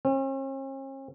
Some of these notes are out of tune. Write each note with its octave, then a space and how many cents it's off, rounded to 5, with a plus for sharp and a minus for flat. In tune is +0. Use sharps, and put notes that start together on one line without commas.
C#4 -45